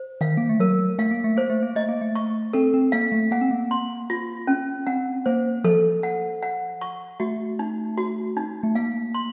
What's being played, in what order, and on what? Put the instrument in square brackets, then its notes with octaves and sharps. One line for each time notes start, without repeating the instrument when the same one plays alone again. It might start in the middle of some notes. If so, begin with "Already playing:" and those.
Already playing: [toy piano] C5
[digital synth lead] D#3 [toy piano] F5
[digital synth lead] A#3
A3
[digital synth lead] F#3 [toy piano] A#4
[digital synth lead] A3 [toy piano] F5
[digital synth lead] A#3
A3
[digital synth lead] A#3 [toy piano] C5
[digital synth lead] A3
A#3
[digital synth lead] A3 [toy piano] D#5
[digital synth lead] A#3
A3
[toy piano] C#6
[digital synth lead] C4 [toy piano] A4
[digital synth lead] C4
[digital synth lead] A#3 [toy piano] F5
[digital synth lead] A3
[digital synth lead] A#3 [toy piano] F#5
[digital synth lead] C4
A#3
[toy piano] C6
F4
C#4
[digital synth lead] C4 [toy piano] F#5
[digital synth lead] A#3 [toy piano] C5
[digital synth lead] F3 [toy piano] A4
[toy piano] F#5
F#5
C#6
[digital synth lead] A3 [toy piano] F#4
[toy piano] D#4
F#4
D#4
[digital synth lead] A3
[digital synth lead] A#3 [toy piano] F5
[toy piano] C6